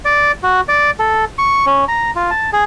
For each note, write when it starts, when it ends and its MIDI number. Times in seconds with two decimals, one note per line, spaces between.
0.05 0.32 74
0.43 0.61 66
0.68 0.91 74
0.99 1.25 69
1.38 1.65 85
1.66 1.85 61
1.88 2.11 82
2.16 2.31 65
2.31 2.50 81
2.53 2.64 68